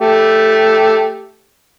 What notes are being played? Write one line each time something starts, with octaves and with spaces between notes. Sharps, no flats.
A3 G4